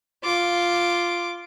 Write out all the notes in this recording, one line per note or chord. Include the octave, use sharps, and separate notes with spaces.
F4 D6